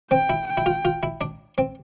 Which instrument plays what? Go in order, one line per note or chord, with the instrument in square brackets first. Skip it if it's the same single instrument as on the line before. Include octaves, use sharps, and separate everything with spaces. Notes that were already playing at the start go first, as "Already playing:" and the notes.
[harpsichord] C4 [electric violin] G5
[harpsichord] E4
[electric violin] G5
[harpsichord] E4
F4
F4
E4
D4
C4